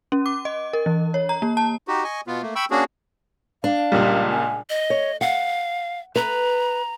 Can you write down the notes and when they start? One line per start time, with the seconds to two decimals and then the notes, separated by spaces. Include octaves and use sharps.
0.12 C#4
0.26 D6
0.45 D#5
0.73 A#4
0.86 E3
1.14 C#5
1.29 A#5
1.42 A#3
1.57 A5
1.88 D#4 F#4 G4
2.04 D#5 G#5 C#6
2.27 B2 B3 F4
2.42 A3 A#3
2.56 G5 B5 C#6 E6
2.71 A#3 C#4 D4 F#4 G#4
3.64 D4 F5
3.92 C#2 A#2 G3
4.30 G#5
4.70 D#5
4.90 C#5
5.21 F5 F#5
6.16 B4 A#5